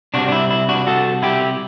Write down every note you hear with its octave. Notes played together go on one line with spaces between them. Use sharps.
C3 G3 C4 D4 F#4
D4
E4
E4
D4 F#4
F#4 A4
E4 G4